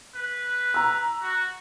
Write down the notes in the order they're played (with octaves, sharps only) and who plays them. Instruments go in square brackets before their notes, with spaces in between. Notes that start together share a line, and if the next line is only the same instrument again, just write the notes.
[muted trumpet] B4
[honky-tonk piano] A#5 E6
[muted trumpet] F#4